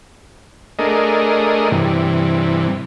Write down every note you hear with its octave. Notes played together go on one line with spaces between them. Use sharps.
A3 D4 G#4 A#4 D#5
G2 C3 E3